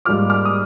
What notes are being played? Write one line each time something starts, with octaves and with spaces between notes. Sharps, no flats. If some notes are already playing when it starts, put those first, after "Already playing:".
G#2 G3 A#3 F4 D6 F6
D6 F6
D#6